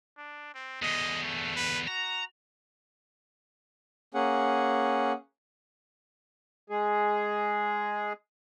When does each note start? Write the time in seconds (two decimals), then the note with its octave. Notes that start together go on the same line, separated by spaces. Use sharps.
0.18 D4
0.54 C4
0.82 E2 D3 D#5
1.23 A3
1.56 B4
1.88 F#4 A#5
4.14 A#3 C#4 G#4 F#5
6.70 G#3 G#4